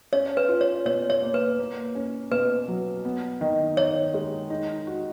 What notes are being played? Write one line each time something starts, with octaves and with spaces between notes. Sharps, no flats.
C#4 C#5
B4
F4
C#5
B2 C#5
C#5
A#3
B4
A#3
C#4
B2 B4
F#3
B3
D#3
D#3 C#5
G#3
D#4
F#4